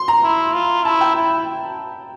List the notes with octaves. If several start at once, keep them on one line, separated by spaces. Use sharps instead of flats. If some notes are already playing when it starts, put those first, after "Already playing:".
Already playing: C6
A#5
E4
F4
E4 A5
G5
E4